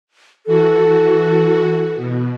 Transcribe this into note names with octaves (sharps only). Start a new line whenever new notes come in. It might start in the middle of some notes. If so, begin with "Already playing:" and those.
E3 F#4 A4
B2